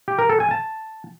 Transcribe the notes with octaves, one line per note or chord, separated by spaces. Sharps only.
G4
A#4
A4
G#5
A5